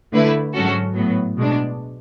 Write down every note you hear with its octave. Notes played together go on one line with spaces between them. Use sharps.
D3 A3 E4 B4
G#2 F#3 C#4 F#4 A4
A2 F#3 B3
B2 G#3 D4